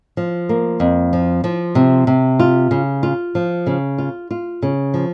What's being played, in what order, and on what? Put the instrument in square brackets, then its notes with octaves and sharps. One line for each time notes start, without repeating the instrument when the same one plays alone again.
[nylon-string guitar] F3
A#3
F2
F3
F3
C3
C3
F4
C#3
F4
F3
C#3
F4
F4
C#3
F3